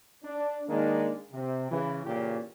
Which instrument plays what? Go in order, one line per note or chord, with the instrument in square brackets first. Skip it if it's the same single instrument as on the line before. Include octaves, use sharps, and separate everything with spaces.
[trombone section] D4
D#3 G#3 A#3 D4 D#4
C3
C#3 E3
A#2 C#3 E3 C#4 G4